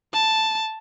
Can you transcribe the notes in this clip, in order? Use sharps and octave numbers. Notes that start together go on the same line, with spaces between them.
A5